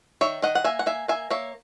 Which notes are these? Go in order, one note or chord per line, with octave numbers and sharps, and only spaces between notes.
D#3 C#5 E5
D#3 D#5 F#5
F#5
A#3 E5 G#5
F#5
A#3 E5 G#5
A#3 E5 G#5
A#3 C#5 E5